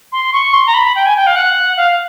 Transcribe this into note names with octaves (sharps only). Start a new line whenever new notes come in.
C6
C#6
C6
A#5
B5
G5
G#5
G5
F5
F#5
F5